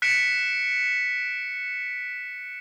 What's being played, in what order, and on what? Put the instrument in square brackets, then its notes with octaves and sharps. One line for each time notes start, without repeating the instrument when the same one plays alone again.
[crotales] F#6 B6 C#7 D7 E7